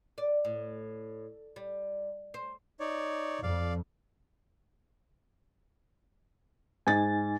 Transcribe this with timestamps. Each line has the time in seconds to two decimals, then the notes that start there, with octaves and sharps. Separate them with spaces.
0.18 D5
0.45 A2
1.56 G3
2.34 C5
2.80 D#4 C#5 D5
3.43 F2 D5 F5
6.87 G#2 D#4 G#5 A6